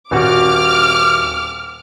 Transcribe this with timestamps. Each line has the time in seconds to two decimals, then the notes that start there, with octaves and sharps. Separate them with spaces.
0.11 D#1 F#4 D6 F6